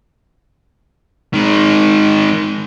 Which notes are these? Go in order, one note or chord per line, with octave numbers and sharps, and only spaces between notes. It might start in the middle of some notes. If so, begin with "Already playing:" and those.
D#3 G#3